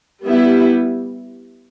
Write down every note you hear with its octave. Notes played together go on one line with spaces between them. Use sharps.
G3 B3 E4